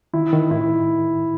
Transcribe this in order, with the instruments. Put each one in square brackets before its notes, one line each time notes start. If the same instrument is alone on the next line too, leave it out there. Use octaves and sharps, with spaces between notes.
[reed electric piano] D#3 [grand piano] E4
[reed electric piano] D#3
[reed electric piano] A2 [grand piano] E4